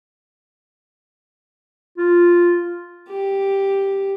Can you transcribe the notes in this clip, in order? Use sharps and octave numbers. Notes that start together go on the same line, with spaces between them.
F4
G4